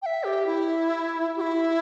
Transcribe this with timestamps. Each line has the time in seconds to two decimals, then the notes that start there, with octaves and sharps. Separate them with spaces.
0.02 G5
0.06 E5
0.24 G4
0.46 E4
1.36 G4
1.41 E4